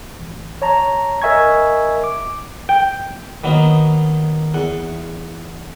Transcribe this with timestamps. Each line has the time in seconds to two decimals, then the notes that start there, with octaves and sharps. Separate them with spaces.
0.19 A1
0.62 C#5 A5 A#5
1.22 A#4 D#5 E5 G#5 C#6 G#6
2.04 D6
2.69 G5
3.44 D#3 F#3 A#3 B3 D#4
4.54 E2 F#5